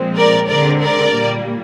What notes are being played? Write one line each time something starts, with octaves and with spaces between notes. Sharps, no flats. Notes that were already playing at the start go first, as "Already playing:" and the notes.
Already playing: A#2 F3 G#3 C4
A#4 D5
D#2 D3 G#3 C4 A#4 D5
A#4 D5
A#2 G3 A#3